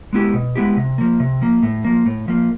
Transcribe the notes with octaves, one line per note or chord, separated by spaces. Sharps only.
G#3 B3 E4 G4
B2
G#3 B3 E4 G4
C3
F3 A#3
C3
F3 A#3
A2
F3 A#3
A2
F3 A#3